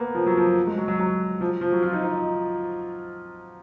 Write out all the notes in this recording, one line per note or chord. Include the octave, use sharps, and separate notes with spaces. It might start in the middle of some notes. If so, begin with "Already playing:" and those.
Already playing: A#3 B3
F3
F#3
F3
G#3
F#3
F#3
F#3
F3
F3
F#3
F4
D#4
D#4